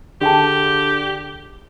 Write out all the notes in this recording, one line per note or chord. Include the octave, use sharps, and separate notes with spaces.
D3 G4 G#4 G5 A5